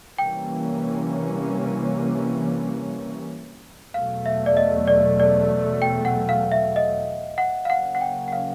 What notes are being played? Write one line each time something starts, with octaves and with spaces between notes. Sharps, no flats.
C3 E3 G3 A#3 C#4 G5
E2 B2 F#3 A3 F5
E5
D5
D#5
D5
D5
G5
F#5
F5
E5
D#5
F#5
F5
C#3 F#3 A#3 C#4 F#5
F#5
G5
F#5
F5